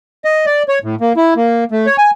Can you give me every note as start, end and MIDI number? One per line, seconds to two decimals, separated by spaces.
0.25 0.46 75
0.46 0.63 74
0.68 0.79 73
0.84 0.95 45
1.01 1.13 58
1.17 1.34 64
1.36 1.64 58
1.72 1.86 57
1.86 1.96 73
1.98 2.11 80